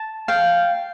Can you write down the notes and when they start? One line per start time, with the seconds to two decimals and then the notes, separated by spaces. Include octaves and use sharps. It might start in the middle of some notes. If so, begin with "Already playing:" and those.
Already playing: A5
0.28 F5 G5